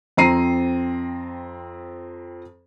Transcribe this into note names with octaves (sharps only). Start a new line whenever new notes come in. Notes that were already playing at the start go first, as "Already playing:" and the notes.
F2 C4 A#5 C7 D#7